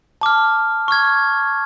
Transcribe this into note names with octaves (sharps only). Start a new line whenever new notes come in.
A5 D6 F6
C#6 F6 G#6